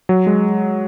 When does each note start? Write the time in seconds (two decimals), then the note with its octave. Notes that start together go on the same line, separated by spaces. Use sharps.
0.09 F#3
0.27 G#3